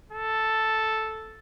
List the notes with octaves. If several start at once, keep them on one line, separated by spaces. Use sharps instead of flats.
A4